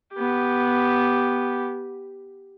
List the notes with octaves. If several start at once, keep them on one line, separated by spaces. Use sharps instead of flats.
B3 G4